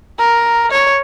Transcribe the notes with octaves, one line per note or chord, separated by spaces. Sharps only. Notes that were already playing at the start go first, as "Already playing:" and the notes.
A#4
C#5